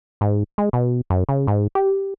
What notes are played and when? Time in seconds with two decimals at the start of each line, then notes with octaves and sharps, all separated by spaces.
0.21 G#2
0.58 G#3
0.73 B2
1.10 F#2
1.29 C#3
1.47 G#2
1.75 G4